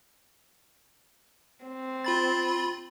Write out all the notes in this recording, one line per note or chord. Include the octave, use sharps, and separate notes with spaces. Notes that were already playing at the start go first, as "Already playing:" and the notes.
C4
F4 B5 A6